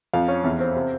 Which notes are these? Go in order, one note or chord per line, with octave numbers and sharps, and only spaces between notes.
F2 F5
C#4
E2
C4
C3